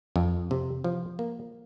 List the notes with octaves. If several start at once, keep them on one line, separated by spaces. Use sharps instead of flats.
F2
C3
F3
A#3